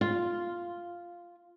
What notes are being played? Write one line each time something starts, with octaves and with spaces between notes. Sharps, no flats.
F4